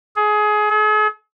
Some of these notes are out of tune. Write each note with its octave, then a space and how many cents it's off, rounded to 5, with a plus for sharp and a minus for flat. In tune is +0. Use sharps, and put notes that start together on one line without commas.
G#4 +25
G#4 +45